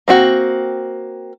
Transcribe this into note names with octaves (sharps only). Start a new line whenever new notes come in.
A#3 C4 F#4